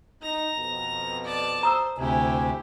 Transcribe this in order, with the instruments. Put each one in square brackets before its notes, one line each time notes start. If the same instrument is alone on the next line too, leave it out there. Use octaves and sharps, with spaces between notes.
[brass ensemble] D#4 [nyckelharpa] A#5
[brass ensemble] F2 B2
[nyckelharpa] D5 A5
[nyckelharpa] C5 [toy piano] A#5 D#6 E6
[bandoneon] D2 C3 [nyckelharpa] E4 G4 [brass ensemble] G#5